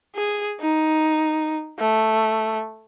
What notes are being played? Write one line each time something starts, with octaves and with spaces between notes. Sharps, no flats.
G#4
D#4
A3